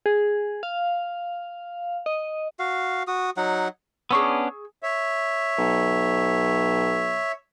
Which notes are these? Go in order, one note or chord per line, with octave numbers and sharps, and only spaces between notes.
G#4
F5
D#5
F#4 F5
F#4 D#6
F#3 D#4 F#5
B3 C#4 D4 G#4 C#6 E6
C#5 E5
B1